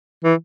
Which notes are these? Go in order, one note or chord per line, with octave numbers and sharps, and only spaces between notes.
E3